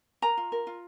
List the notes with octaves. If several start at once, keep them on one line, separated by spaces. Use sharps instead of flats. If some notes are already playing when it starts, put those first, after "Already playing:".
A#4 A#5
F4
A#4
F4